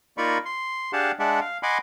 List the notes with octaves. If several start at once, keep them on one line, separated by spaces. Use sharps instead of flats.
A#3 D#4 F4 D5 B5 C#6
C6
D4 G4 G#4 F5 F#5 A5
G#3 D4 D5 E5 F#5
F5
D#5 F#5 G#5 B5 C6 D6